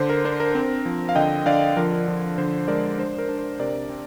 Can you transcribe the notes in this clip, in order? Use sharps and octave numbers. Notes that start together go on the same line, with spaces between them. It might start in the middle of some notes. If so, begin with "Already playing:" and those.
Already playing: D3 C5
A#4
D4 C5
A#4
C4
F3
F5
D3 D#5 G5
D3 D5 F5
F3 A#4
A#4
F3
D3 C5
G#3 A#4 D5
D4 C5
A#4
D4
C5
C3 A#4 D5
C4